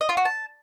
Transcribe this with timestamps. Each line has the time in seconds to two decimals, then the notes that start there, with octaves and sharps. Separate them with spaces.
0.01 D#5
0.09 F4
0.17 F#4
0.25 A5